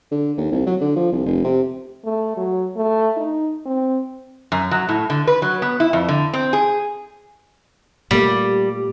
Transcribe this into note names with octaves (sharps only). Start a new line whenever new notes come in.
D3
D#2
C2
F#3
D3
F3
C2
F1
C3
A3
F#3
A3
D#4
C4
F#2
F#3
A2
D3
B4
F#3
B3
E4
F2
D3
C4
G#4
A#2 G3 A3 A#3